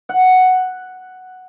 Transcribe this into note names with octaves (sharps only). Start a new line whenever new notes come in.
F#5